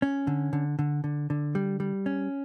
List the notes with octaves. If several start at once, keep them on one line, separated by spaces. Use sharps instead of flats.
C#4
D3
D3
D3
D3
D3
G3
G3
C#4